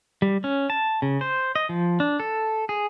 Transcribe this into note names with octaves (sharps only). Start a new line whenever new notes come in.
G3
C#4
A5
C#3
C5
D#5
F3
D4
A4
G#4